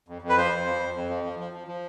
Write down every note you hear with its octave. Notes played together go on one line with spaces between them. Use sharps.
F2
F2
B4
F3 C5
F2
F3
F2
F2
F3
F3
F3
F3
F3